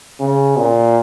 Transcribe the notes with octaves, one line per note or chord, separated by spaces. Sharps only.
C#3
A#2